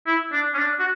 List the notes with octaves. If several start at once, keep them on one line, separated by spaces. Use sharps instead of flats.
E4
D4
C#4
D4
F#4